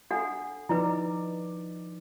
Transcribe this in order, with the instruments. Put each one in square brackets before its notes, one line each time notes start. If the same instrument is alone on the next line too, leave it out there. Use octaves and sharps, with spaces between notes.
[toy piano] D4 A4 F#5
[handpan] F3 D#4 D5 [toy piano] E4 B4